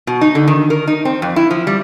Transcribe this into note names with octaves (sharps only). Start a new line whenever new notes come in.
B2
D#4
D3
D#3
A#4
D#4
C4
F2
E4
F3
G3